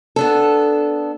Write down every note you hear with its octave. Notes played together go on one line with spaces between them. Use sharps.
B3 D4 A4